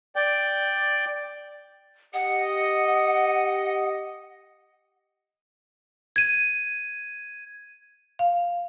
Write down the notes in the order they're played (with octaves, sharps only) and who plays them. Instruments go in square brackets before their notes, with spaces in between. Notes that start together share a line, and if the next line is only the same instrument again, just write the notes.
[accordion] D5 G5
[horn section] G4 D#5 [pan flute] F#5
[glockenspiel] G#6 D#7
[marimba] F5